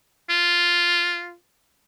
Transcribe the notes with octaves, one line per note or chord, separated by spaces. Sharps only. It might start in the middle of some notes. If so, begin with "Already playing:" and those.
F4